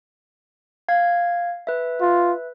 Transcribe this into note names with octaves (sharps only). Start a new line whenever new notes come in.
F5 G#6
B4 E5
F4